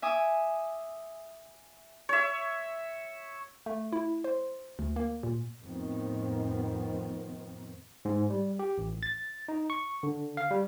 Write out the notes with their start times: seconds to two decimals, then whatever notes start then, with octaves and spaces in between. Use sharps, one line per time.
0.02 E5 G#5 D6 D#6
2.09 C#5 E5
3.66 A3
3.92 E4
4.24 C5
4.79 D2
4.96 A#3
5.23 A#2
5.62 F2 A2 D#3 B3 C4
8.05 G#2
8.30 G3
8.59 G4
8.78 A1
9.03 A6
9.48 D#4
9.70 C#6
10.03 D3
10.37 F5
10.51 G3